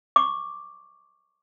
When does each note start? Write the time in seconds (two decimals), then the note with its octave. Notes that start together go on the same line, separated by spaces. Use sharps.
0.16 C#6 D6